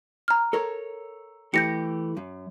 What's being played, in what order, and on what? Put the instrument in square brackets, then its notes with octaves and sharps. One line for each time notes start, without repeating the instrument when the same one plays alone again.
[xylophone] A#5 F6
[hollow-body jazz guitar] A4 A#4 C#5
[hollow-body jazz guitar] E3 A3 G4 [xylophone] G6 A#6 C#7
[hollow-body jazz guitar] F#2